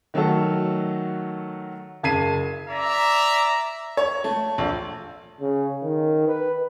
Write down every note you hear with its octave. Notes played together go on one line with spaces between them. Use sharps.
D#3 F#3 A3 F#4 A4
F#1 A5 G#6 B6 C7 D#7
D5 E5 A#5
C#5
A3
A#1
C#3
D#3
B4